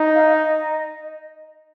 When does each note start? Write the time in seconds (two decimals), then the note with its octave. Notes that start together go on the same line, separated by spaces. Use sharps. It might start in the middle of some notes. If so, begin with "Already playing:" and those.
Already playing: D#4
0.15 F5
0.34 D#5